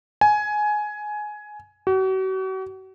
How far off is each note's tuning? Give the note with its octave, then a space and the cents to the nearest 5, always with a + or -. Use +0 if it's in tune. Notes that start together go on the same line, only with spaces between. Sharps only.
G#5 +15
F#4 +40